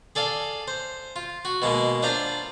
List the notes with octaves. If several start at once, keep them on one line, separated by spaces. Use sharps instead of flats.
G#4 A4 D5 F5
C5
F4
F#4
B2 G#3 A#3
D4 F4 C5 D5 A#5